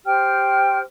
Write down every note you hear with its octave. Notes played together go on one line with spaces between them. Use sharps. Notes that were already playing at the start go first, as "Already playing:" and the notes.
G4 C5 G5 F6